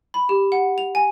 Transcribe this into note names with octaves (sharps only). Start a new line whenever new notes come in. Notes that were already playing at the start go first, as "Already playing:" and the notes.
B5
G4
F#5
F7
G#5